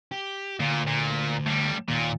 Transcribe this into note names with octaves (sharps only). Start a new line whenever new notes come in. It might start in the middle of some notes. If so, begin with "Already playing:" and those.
G4
D2 A#2
A#2
A2 G3
D#2 A#2